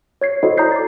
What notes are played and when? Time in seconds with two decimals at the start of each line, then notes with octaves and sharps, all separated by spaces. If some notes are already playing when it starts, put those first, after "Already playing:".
0.21 C#5 G#6 C7
0.43 E4 F#4 A4 C5 C#5 D#5
0.58 D5 A#5 D#6 G6 C7
0.72 D6 A6